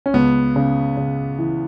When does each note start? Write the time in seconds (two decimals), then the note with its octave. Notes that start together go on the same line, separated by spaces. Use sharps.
0.06 C#4
0.14 C#2 B3
0.56 C#3
0.97 C#3
1.38 E3